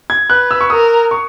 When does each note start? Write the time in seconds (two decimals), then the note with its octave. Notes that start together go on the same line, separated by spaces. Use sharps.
0.10 G#6
0.30 B4 F#6
0.51 E6
0.61 C#6
0.70 A#4 D#6
1.11 C#6